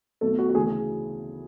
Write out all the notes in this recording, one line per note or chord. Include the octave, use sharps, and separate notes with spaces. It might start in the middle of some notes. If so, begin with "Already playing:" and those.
B1 B2 A3 A4
F#4
F#4
D2 C#3 E3 G#4
G#4